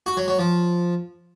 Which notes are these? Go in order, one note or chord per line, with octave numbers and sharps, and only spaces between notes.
F#4
F#3
F#3
F3